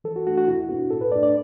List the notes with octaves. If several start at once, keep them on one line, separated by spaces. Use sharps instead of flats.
E3 A4
F#4
A3 D4 F#4
F#4
B2 E4
B3 D4 F#4
A2 A4
B4
A3 D4 D5
D5